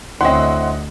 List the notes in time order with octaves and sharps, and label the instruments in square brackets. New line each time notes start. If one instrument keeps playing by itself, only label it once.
[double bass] D2 [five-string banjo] C4 C#4 E4 [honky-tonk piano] D#5 F#5 [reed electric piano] C6